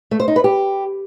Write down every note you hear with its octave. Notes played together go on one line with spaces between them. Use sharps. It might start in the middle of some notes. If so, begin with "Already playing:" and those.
A3
C5
D#4
B4
G4